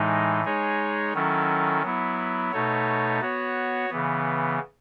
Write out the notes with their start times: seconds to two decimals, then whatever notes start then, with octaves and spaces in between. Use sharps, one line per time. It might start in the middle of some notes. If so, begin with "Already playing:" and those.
Already playing: A2 E3 G#3 D#4
0.44 G#3 D#4 G#4 C#5
1.13 D#3 F#3 C#4 E4 A4
1.82 F#3 B3 E4
2.52 B2 A3 D#4 A4 C#5
3.21 B3 F#4 C#5
3.90 C#3 E3 B3